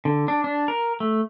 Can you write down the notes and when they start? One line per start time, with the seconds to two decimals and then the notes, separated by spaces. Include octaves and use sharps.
0.05 D3
0.28 D4
0.44 D4
0.68 A#4
1.00 A3